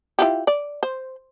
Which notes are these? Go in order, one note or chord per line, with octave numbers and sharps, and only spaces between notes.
E4 F4 G4
D5
C5